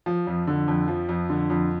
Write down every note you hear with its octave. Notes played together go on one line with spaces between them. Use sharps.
F3
F2
D3
F2
F3
F2
D3
F2